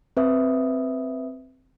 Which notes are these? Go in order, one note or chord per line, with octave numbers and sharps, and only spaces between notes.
C4 B4 E5 D#6